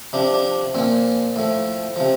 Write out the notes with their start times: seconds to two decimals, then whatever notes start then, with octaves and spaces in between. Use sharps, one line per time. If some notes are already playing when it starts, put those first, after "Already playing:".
0.13 C3 F3 D4
0.34 D4
0.75 A#2 F3 C4
1.36 A2 F3
1.96 C3 F3